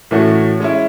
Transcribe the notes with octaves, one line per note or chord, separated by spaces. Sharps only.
A2 E3 A3 C#4 F#4
G#3 C#4 E4